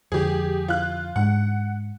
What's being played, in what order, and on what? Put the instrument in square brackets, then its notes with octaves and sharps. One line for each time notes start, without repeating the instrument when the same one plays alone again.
[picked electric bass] F2 D3 [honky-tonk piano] G4 G#4
[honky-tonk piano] F4 F#6
[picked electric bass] G#2 G#3 D4 [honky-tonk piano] F#5